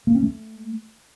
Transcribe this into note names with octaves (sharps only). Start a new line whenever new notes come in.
A#3
C#4
A3